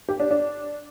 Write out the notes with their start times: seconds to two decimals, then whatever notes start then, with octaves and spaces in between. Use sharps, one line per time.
0.09 G4
0.20 D4
0.31 D4